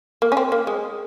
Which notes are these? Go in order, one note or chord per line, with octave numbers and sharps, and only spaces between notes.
A#3
C#4
C4
A#3
G#3